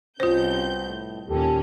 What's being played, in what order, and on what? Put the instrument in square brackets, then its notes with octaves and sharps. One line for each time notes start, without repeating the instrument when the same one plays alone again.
[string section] C2 G6 [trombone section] B2 C4 [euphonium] C#4 [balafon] F4 C5
[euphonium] A2
[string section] D#2 A#2 C#4 [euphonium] G4 [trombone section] A4